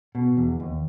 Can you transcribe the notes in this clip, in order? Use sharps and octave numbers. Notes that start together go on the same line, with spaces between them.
B2
E2
D#2